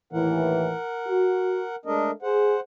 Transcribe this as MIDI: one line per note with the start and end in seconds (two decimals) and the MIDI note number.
0.13 0.72 39
0.13 0.72 45
0.13 0.72 52
0.13 1.76 70
0.13 1.76 78
1.06 1.63 66
1.85 2.10 56
1.85 2.10 57
1.85 2.11 62
1.85 2.11 70
1.85 2.11 75
2.22 2.54 68
2.22 2.60 72
2.22 2.60 78